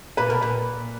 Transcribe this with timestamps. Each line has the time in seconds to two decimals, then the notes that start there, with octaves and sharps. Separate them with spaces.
0.17 A#2 B4
0.29 B2 A#4
0.41 A#2 B4